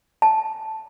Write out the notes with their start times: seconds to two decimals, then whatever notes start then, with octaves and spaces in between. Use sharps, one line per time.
0.22 A5